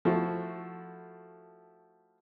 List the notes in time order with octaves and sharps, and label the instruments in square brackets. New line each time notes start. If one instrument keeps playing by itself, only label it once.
[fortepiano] F3 A3 E4 F#4